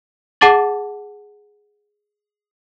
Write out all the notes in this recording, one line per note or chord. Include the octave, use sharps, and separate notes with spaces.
G#4 F#5 A5 D6 A6 F#7